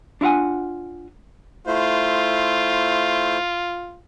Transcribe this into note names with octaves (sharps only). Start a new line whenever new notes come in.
D4 E4 F4 F#5 G#5
A3 E4 F4 C5